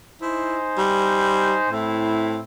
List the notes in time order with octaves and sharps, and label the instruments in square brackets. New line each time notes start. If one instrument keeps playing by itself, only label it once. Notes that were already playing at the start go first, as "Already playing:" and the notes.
[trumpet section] D#4 C5 G#5 [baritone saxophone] E4
[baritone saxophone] G3
[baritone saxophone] A2 [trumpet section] C4 E4